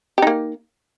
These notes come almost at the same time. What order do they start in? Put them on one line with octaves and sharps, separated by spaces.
G4 D#4 A#3